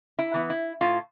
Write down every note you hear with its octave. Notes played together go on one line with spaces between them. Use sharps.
E4
E3 B3
E4
A2 F4